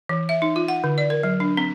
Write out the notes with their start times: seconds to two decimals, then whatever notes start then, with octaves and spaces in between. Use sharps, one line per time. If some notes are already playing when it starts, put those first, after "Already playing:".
0.09 E3
0.29 E5
0.42 D#4
0.56 F4
0.68 F#5
0.84 D3
0.98 D5
1.10 A#4
1.23 F#3
1.40 D4
1.57 C4